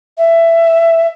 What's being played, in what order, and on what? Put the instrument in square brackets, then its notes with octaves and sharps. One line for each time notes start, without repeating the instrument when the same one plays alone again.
[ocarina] E5